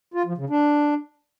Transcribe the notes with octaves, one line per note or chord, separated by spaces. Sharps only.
F4
F3
C#3
D4